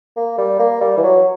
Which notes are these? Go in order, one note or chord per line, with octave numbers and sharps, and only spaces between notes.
A#3
G3
A#3
G3
E3
F#3